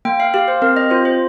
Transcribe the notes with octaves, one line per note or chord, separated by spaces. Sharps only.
A#3 G5
F5
G4 F5
C5
C4 A#4
D#5
F4 C5
C5